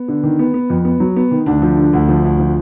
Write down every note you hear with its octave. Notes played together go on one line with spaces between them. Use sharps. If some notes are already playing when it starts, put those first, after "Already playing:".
Already playing: B3
D3
D#3
B3
B3
F2
B3
F#3
B3
D#3
D2 D4
F3
D3
D2
F3
D2
F3